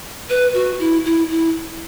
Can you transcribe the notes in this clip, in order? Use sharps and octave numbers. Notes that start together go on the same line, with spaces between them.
B4
F#4
E4
E4
E4